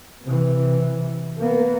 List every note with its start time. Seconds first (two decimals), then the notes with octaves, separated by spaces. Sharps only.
0.23 C3 E3
1.38 A#3 B3